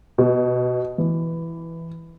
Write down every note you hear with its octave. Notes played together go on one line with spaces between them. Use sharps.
B2
E3